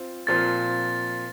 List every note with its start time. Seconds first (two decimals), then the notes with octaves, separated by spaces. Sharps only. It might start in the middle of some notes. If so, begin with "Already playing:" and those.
Already playing: C4 F4
0.27 A#2 F3 C4 F4 A6